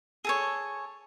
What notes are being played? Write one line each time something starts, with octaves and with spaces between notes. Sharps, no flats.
G#4 A4 C#5